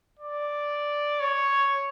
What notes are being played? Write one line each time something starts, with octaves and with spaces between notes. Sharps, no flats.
D5
C#5